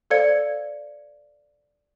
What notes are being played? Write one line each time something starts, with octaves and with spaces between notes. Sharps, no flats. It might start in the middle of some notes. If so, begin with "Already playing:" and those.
A4 C5 D5 F5 G#6 C#7